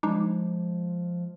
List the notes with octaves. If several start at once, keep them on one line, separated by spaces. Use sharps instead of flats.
F3 G#3 D4 D#4 D6